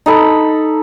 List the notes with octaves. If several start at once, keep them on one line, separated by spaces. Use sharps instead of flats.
D#4 A4 B5